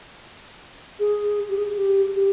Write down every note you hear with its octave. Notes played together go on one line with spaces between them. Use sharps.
G#4
G4
G#4
G4
G4